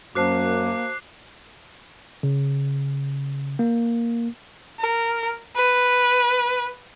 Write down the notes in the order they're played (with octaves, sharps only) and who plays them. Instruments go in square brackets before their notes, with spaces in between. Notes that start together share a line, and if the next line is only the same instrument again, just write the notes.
[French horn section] F#2 [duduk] A#3 [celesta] F#4 C5 A5 [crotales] D6 F#6 C7
[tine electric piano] C#3
A#3
[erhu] A#4
B4